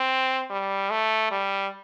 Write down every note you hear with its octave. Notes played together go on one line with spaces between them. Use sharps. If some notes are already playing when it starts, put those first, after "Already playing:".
Already playing: C4
G3
A3
G3